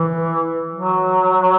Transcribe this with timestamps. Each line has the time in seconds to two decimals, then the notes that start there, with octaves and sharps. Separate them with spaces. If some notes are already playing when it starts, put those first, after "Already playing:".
Already playing: E3
0.75 F#3